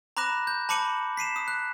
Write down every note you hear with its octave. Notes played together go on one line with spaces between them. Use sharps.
A#5 B5 D6 F#6 A#6 E7
G6
A5 B5 D6 C#7 D#7 F#7
B6 C7 D#7 E7
D#6
F#6